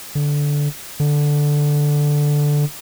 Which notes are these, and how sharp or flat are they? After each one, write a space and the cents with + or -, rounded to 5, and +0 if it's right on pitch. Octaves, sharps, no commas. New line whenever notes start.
D3 -10
D3 +0